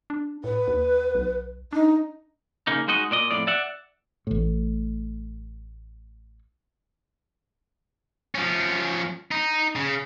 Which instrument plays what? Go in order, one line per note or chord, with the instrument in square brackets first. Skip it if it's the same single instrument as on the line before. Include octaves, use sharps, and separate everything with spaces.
[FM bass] D4
[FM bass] A2 [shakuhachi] B4
[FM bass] D#2
B1
[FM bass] D4 [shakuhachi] D#4
[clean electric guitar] C#3 A#3 D#4
G#3 D#4 F#4 D#5
A#2 D5 D#5
F2 A2 D5
D5 E5 F#5
[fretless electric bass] A1 A2
[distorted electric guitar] F3 C#4
D#4
C#3